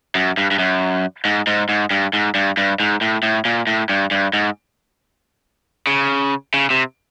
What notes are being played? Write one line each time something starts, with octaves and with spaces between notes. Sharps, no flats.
F#2
G2
G2
F#2
G#2
G#2
G#2
G2
G#2
G2
G2
G#2
A2
A2
A#2
A2
G2
G2
G#2
C#3
C#3
C3